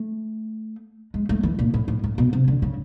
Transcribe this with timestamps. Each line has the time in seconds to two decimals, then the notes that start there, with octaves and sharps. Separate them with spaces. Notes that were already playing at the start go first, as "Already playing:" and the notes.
Already playing: A3
1.14 G#3
1.29 A3
1.43 E3
1.59 A#2
1.74 A2
1.88 A2
2.04 A2
2.18 B2
2.33 C3
2.48 D3
2.62 C#3